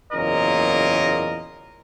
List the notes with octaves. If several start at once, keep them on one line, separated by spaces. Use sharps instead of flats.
F#1 E2 A#2 C#4 A#4 D#5